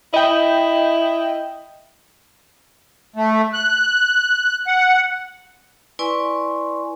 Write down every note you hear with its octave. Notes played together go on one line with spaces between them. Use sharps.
E4 D#5 G5
A3
F#6
F#5
E4 B4 D5 G#5 C6 C#6